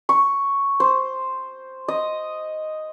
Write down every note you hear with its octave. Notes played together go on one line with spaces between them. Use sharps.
C#6
C5
D#5